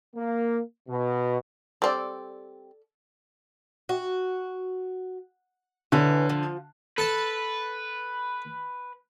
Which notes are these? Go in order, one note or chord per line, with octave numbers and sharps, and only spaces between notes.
A#3
B2
G3 C4 A4 D5
F#4
D3 E3 C#4 B4
F3
A4 B4 A5